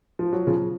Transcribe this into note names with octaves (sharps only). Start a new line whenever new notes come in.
F3
F#3
C#3 F3